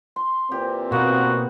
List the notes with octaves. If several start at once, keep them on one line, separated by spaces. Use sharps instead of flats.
C6
A#2 E3 C4 G4
B2 A#3 B3 D#4 F#4